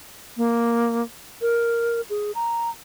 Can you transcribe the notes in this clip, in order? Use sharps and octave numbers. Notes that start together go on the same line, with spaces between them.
A#3
A#4
G#4
A#5